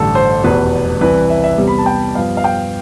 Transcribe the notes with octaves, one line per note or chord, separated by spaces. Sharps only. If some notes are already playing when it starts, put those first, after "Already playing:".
Already playing: A1 G2 D3 A3 A4
C5
F1 E2 B2 B4
C2 C3 E3 B4
E5
E5
E2 C3 G3 B3
B5
A5
G5
G2 F3 B3 F5
F5
G5